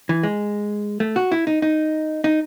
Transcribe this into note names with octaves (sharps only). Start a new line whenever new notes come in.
E3
G#3
A3
F#4
E4
D#4
D#4
D#4